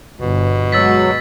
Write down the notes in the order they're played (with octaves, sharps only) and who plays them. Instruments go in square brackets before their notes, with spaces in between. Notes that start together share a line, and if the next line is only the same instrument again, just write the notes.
[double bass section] G1 [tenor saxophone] B2
[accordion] F#3 [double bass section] G#3 [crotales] E6 A6 B6